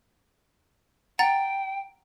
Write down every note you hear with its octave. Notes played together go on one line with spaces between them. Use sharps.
F#5 G5 A#5 A6